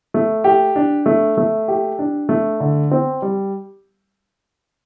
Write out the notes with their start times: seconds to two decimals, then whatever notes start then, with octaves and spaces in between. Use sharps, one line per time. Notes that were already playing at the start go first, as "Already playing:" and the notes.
0.14 A3
0.44 G4
0.76 D4
1.06 A3
1.37 A3
1.68 G4
1.99 D4
2.29 A3
2.60 D3
2.91 C4
3.22 G3